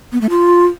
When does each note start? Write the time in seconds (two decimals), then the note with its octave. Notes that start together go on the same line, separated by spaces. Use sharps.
0.12 B3
0.21 A3
0.30 F4